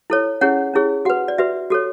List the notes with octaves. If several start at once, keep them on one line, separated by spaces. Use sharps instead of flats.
E4 A4 C#5
C#4 E4 G#4 C#5 F#5
C#4 E4 G#4 C#5
F#4 B4 F#5
D5
F#4 B4 E5
F#4 A4 C#5